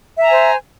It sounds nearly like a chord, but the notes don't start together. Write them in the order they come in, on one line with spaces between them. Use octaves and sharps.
E5 A#5 G#5 C5